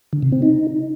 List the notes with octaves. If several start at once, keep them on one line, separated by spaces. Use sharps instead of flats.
D3
C3
C4
D#4